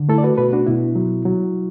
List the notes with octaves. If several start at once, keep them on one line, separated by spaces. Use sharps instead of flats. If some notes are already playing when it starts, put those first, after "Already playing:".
Already playing: D3
A3 E4 A4
D5
F#4 B4
B2 F#4 B4
D4 F#4
B2 E4
F#3
F#3